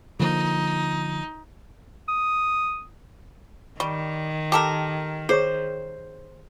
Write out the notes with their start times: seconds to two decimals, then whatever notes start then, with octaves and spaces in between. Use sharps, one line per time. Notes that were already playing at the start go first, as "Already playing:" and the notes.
0.19 D3 F3 A#3 D#4
2.08 D#6
3.80 D#3 G3 C#6
4.52 G4 A4 A#4 D6
5.29 G#4 C5 C#5 C#6